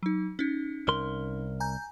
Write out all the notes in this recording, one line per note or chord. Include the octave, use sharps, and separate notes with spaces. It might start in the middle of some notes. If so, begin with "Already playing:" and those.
F#3 D#4
C#4 D#4
C2 A#4 C6
G#5 A#5 G6